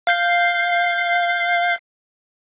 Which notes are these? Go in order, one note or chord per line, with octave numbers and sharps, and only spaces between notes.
F5 G6 C7